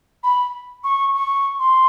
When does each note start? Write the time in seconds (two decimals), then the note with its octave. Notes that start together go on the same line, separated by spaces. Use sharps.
0.23 B5
0.84 C#6
1.14 C#6
1.59 C6